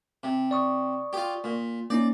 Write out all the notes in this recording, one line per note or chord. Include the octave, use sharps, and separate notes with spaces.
C3
D5 C#6 D#6
F4 G4
A#2
A#3 C#4 D#4 D5